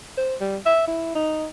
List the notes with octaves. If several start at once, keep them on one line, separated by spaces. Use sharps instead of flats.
C5
G3
E5
E4
D#4